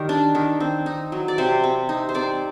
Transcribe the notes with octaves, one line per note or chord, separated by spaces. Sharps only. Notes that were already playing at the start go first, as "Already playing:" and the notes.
Already playing: D#3 G3 G4 A#4
D4
D#3
C4
D#4
F#3
D5
C3 C5
C4
D#4
C5
C4 D5